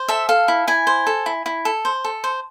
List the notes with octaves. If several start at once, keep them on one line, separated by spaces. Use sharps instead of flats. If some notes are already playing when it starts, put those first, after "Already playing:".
Already playing: C5
A4 E5
A4 F5
E4
E4 G#5
C5
A4
E4
E4
A4
C5
A4
C5